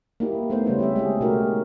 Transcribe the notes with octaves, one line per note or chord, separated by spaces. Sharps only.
A#3 D#4 E4 G4
A3 B3 C5
C#3 G3 C#4 E4
C4 G4 E5
G#3 G4 G#4
B2 A3 D#4 F#4 G4 A#4